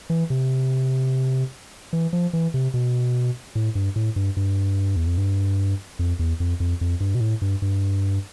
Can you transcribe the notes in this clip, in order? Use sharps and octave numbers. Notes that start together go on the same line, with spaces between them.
E3
C3
E3
F3
E3
C3
B2
A2
G2
A2
G2
G2
E2
F2
G2
F2
E2
F2
F2
F2
G2
B2
A2
G2
G2